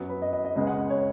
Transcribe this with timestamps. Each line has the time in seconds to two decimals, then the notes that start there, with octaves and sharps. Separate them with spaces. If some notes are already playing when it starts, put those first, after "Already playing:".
Already playing: F#2 F#3 B3 F#5
0.09 B4
0.22 D#5
0.33 D#5
0.45 D#5
0.56 C#2 C#3 G#3 B3 D#5
0.67 F#5
0.90 C#5